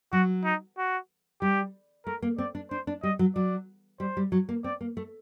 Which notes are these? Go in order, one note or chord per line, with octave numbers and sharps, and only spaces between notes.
F#3 F#4
D#4
F#4
G3 G4
A3 A#4
A#3
C4 D5
D4
D4 C5
D4
G3 D#5
F#3
F#3 D5
G3 C5
G3
F#3
A#3
C4 D5
A#3
A3